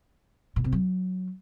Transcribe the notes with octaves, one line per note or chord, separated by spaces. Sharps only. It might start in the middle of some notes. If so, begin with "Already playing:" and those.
A#2
C3
F#3